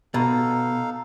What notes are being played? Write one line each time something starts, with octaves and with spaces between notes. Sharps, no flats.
B2 D#4 A4 F5